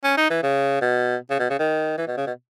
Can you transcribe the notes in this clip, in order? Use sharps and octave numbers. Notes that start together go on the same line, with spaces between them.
C#4
D#4
E3
C#3
B2
C#3
B2
C#3
D#3
E3
B2
C#3
B2